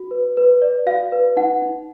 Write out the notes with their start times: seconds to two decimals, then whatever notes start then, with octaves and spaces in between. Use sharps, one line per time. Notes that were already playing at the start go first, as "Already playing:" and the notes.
Already playing: F#4
0.11 B4
0.37 B4
0.62 D5
0.86 F#4 F5
1.12 B4
1.37 D#4 F#5
1.62 D#4